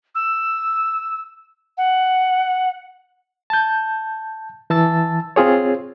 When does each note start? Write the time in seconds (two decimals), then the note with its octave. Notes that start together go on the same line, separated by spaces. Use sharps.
0.15 E6
1.78 F#5
3.50 A5 G6
4.70 E3 A5 E6 A6
5.36 C4 F4 G#4 C#5